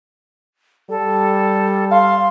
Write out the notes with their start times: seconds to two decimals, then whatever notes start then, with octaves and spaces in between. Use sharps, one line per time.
0.89 G3 A4
1.91 F5 C6